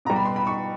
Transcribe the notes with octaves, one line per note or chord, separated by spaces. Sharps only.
B2 G3 A#5
B5
C6
B5
C#6